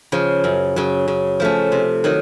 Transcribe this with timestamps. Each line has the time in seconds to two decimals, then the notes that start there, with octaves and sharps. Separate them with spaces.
0.12 C#3 F3
0.44 F#2
0.76 C#3 F#3
1.08 C#3
1.40 F3 A3 C#4
1.72 C3
2.04 D#3 F#3